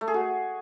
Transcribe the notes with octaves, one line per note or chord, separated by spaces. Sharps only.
A3
G#4
F#4